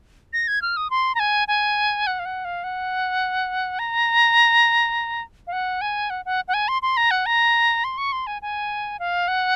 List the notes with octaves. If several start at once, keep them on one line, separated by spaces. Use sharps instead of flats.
A#6
G#6
F6
D#6
C6
A#5
G#5
G#5
F#5
F5
F#5
F5
F#5
A#5
F5
F#5
G#5
F#5
F#5
F#5
G#5
C6
C6
A#5
F#5
A#5
C6
C#6
C6
G#5
G#5
F5
F#5